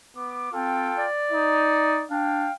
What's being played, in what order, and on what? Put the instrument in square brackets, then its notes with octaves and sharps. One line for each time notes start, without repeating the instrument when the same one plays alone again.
[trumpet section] B3 D6
[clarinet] C4 [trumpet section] F4 A4 G5
[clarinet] D5
[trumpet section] D#4
[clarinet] D4 [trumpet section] F5 G5